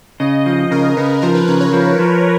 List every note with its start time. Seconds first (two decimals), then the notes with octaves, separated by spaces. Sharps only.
0.20 C#3 D#5
0.46 F3 D#5
0.71 C#3 A#4
0.97 C#3 B4
1.22 F3 A#4
1.35 B4
1.48 C#3 B4
1.60 C#5
1.73 F3
1.99 F3